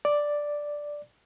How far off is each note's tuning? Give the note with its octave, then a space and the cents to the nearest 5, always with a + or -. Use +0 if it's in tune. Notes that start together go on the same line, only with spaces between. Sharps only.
D5 +0